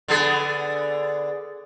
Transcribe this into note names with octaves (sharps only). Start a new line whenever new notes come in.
D3 B3 G#4